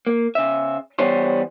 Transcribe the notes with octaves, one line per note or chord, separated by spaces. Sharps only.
A#3
C#3 E5
E3 G3 B3 C5 C#5